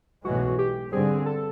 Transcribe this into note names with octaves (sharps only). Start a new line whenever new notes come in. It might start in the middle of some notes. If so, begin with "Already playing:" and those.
B1 A2 E3 G#3 F#4
G4
G2 D3 G3 C4 G#4
A4